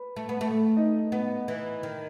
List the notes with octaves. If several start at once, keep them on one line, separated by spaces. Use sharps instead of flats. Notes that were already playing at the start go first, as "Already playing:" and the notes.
Already playing: B4 B5
A3
B3
A3
D#4 D#5
B3
E3
D#3